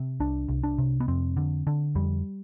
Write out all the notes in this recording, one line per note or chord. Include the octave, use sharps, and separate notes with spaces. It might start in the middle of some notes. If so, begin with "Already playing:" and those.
Already playing: C3
C2 D4
C2
D4
C3
B3
F2 C4
D3
D3
F2 G3